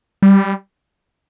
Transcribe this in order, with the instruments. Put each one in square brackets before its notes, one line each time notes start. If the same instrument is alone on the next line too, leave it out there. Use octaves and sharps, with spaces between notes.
[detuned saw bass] G3